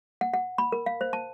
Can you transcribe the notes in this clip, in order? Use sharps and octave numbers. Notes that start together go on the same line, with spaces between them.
F#5
F#5
B5
A#4
F5
C5
A5